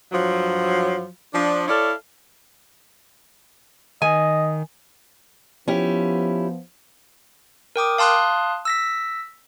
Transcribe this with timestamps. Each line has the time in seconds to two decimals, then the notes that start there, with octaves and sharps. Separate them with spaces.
0.12 G2 F3 F#3
1.34 F3 D4
1.68 E4 A4 C#5 D5 F5
4.02 D#3 D#5 G#5
5.68 F3 B3 C#4 E4 G4
7.76 A#4 G5 D6 D#6
7.98 F5 A5 C6 D#6 F#6
8.65 E6 A#6 B6